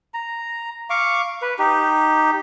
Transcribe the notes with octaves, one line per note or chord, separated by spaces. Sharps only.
A#5
F5 C#6 D6
B4
D#4 G4